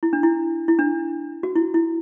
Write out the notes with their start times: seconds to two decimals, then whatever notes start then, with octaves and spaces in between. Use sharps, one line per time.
0.03 E4
0.13 D4
0.23 E4
0.68 E4
0.79 D4
1.43 F#4
1.56 E4
1.74 E4